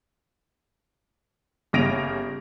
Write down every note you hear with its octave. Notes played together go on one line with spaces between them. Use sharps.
G1 C#3 A#6 D7 F7